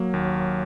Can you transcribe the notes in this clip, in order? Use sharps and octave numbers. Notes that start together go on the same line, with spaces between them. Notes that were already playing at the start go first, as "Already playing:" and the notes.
Already playing: F#3 A#3
D#2